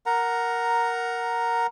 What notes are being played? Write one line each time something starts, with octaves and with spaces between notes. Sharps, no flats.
A#4 F#5 A#5